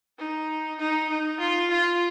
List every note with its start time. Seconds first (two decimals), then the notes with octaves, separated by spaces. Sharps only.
0.18 D#4
0.79 D#4
1.09 D#4
1.40 F4
1.70 F4